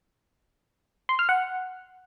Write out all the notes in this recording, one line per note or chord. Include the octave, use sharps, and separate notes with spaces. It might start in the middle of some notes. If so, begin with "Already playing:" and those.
C6
F6
F#5